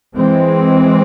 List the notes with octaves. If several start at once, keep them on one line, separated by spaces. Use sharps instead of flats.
E3 G#3 C4